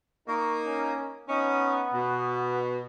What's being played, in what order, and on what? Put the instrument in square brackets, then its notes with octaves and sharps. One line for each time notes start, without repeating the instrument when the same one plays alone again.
[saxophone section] A#3 D#4 [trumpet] C#6
[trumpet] C#4
[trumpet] B3 [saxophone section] C#4 D#4
[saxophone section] B2